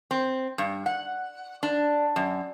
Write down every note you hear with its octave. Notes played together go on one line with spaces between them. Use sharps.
C4
G2
F#5
D4
F#2